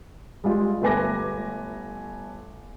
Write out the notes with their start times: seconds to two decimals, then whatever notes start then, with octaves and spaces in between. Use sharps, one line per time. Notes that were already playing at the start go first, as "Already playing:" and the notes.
0.44 G3 G#3 F4
0.82 G1 A3 B4 G#5 D6 A#6